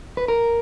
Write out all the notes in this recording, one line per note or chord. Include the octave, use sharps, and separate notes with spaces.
B4
A#4